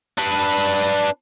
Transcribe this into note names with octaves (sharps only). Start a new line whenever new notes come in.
D4 B4